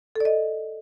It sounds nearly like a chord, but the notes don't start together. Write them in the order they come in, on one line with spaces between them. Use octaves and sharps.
A4 D5 D#5